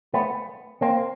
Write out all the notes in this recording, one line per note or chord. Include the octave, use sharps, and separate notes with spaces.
A3 B3
A#3 C4